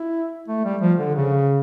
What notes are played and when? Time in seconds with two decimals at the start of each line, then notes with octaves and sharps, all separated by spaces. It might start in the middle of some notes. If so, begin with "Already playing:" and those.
Already playing: E4
0.48 A3
0.65 G3
0.81 F3
0.99 D3
1.15 C#3